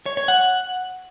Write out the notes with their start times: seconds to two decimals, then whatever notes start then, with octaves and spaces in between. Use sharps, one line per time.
0.06 C#5
0.17 C#5
0.28 F#5